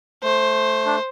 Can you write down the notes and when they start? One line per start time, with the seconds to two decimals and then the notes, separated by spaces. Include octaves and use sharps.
0.24 A3 C5
0.86 D4